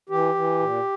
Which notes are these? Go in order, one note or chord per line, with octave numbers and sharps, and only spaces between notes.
E3 G4
E3
A#2